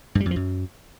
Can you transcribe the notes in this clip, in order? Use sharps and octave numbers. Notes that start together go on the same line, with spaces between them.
G2
G3
F2
F3
F#2